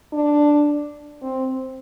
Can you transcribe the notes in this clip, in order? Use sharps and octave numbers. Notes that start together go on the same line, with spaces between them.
D4
C4